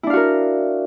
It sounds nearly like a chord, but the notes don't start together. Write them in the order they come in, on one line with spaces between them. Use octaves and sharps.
E4 D4 F5 F#4 A#4